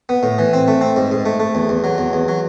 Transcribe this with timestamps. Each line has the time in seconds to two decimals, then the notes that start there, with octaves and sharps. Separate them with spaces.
0.09 B3
0.23 A2
0.39 E3
0.53 C4
0.68 A3
0.81 C4
0.96 G#2
1.11 G#2
1.26 A3
1.40 A3
1.55 E2
1.69 E2
1.84 F#3
1.98 E2
2.13 E2
2.28 F#3